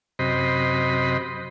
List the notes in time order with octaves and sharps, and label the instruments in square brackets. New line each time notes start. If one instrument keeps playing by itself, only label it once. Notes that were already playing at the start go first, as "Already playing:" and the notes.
[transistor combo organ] F#2 C3 C5 D#5 B5